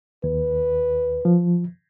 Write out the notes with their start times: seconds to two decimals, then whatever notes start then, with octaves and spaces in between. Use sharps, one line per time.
0.24 D#2 B4
1.25 F3